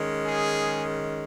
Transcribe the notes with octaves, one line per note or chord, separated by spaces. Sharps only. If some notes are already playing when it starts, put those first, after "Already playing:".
Already playing: D#3 G#3 C#4
G#4